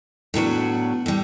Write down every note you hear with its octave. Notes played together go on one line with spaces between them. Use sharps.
A2 F#3 B3 D4 F#4
A2 G3